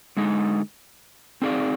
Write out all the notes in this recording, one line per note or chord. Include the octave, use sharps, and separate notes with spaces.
D3 G#3 D#4
C4 D#4 G#4 D5 F5